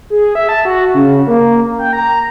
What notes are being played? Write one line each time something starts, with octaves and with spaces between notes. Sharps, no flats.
G#4
E5
A5
F#4
C#3
A#3
G5
A#5